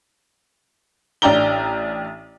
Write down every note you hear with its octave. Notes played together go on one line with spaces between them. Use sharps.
A1 D4 D5 G5 A#5 G7